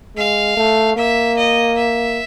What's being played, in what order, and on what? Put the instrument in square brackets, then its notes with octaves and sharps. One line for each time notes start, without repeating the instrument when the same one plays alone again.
[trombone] G#3 [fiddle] F5
[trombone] A3
[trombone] A#3 [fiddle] E5
[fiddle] D#5
E5